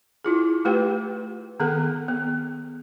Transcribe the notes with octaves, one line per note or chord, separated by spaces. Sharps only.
E4 F4 G#4
A3 F4 G4 B4 G5
D#3 B3 G#4 A4 F#5
B3